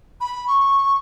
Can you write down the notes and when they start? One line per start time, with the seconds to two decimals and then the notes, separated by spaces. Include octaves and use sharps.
0.21 B5
0.48 C#6